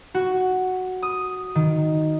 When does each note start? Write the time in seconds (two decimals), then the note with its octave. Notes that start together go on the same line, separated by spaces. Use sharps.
0.14 F#4
1.02 D#6
1.55 D#3